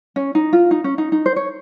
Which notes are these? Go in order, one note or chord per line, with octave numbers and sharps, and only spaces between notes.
C#4
D#4
F4
D#4
C#4
D#4
D#4
C5
C#5